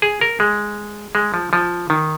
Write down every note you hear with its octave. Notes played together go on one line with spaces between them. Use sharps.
G#4
A#4
G#3
G#3
F3
F3
D#3